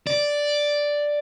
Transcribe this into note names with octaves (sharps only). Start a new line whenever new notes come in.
D5